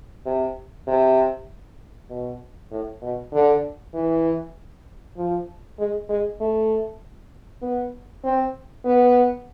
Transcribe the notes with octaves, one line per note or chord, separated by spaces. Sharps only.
C3
C3
B2
A2
B2
D3
E3
F3
G#3
G#3
A3
B3
C4
B3